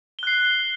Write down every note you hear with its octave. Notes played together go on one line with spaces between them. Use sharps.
F#6 C7 G7